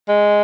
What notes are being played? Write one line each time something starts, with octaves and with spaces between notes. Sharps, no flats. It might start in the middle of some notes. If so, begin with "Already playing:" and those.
G#3